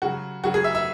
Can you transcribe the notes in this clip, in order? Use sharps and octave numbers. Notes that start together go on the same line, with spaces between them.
C#3 F#3 F#4
C#3 F#3 F#4
G#4
E5
E5